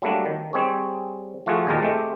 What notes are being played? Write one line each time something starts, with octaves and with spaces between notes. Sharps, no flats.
F#3 G3 A3 A#3 D4
D#3
G3 C4 G#4 C#5
F3 A3 F4 F#4 G#4
D#2 A#2 G#3 G4 A#4 A5
G#3 A3 C4 G4